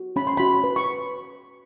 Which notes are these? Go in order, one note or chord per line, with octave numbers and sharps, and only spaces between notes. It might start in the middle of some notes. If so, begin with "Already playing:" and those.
Already playing: F#4
C#4 B5
C6
F#4 B5
B4
C#6